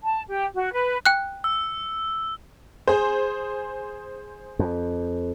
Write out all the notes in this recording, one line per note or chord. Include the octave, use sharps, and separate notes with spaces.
A5
G4
F#4
B4
G5 F#6
E6
G#4 C5
F2